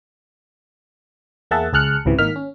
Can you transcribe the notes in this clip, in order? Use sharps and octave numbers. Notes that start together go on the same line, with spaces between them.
E2 A#3 G#4 E5 F#5 A5
C#2 G#4 A5 F6 F#6 C#7
G#1 C#2 C3 E3
G#1 D#3 A#3 D#4 F6 B6
C#4